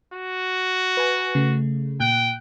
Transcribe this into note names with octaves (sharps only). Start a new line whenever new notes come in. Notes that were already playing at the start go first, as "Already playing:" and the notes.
F#4
B4 G#5
C#3 A3
A#2 G5 F#6